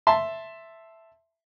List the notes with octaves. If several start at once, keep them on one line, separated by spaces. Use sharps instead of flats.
E5 A5 C6